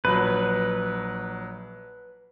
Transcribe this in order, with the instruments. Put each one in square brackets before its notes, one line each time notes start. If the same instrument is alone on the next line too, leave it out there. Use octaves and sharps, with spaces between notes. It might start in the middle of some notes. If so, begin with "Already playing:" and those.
[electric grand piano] A#1 F#3 [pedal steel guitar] B4